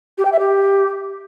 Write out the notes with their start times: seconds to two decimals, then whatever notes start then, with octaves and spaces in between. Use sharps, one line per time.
0.18 G4
0.25 G5
0.32 E5
0.39 G4